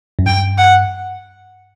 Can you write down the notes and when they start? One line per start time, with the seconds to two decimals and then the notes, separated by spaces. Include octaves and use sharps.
0.19 F#2
0.26 G2 G5
0.58 F#5